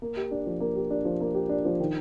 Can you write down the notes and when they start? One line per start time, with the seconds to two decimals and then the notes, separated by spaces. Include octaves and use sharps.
0.02 A#3
0.17 G4
0.31 D4
0.46 F3
0.60 A#3
0.76 G4
0.91 D4
1.05 F3
1.21 A#3
1.35 G4
1.49 D4
1.65 F3
1.80 D#3